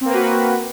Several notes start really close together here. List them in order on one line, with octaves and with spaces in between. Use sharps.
C4 A#3 B4 F#4